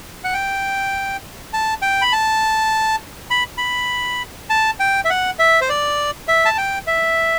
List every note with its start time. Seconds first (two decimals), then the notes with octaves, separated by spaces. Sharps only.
0.24 F#5
0.33 G5
1.53 A5
1.82 G5
2.02 B5
2.13 A5
3.30 B5
3.58 B5
4.50 A5
4.80 G5
5.05 E5
5.10 F#5
5.39 E5
5.61 C5
5.69 D5
6.28 E5
6.45 A5
6.58 G5
6.87 E5